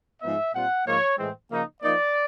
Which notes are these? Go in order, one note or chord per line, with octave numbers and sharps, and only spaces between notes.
G#2 F3 G#3 B3 D#4 E5
A#2 G3 C4 F4 F#5
G#2 F3 A#3 D#4 C#5
A2 E3 G#3 C4
C#3 F3 A#3 D#4
F3 A#3 D#4 D5